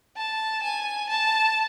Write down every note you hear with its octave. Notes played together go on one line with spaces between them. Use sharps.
A5
G#5
A5